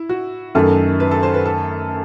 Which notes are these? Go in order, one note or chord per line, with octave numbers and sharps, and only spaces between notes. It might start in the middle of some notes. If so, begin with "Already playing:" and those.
Already playing: E4
F#4
F#2 D#3 A3 A4
B4
A4
C5
B4
A4